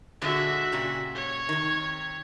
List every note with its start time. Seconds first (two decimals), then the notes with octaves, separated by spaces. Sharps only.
0.22 A#2 D3 G#3 F#4 E5
0.72 A#2 C#3 G4
1.15 C#5
1.49 C3 D#3